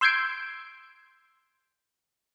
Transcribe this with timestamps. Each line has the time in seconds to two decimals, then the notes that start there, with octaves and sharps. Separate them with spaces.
0.01 C6 E6 G6 G#6 C7 D7